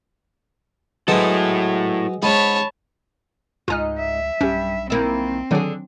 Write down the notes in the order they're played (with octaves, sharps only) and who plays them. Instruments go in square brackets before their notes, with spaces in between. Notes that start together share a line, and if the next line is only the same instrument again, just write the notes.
[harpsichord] F#3 B3 C5 [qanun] G#3 [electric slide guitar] E4 A4
[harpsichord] G#2 C#4 [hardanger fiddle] C#5 A5 [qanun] B5
[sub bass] C#2 [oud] G#2 D#4 [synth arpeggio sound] F4 G#5 F6
[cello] E5
[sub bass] B1 [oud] G2 [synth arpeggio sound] C#4 G4
[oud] D#3 A#3 E4 [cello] C4
[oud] D3 G#4 [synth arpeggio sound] D#3 F#3 D4